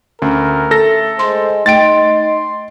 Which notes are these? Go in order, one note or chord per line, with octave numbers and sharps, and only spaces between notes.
D2 C#4 A#4
A3 A4 A#6
G#3 C5 C6
A3 D#4 G5 C6 A6 D7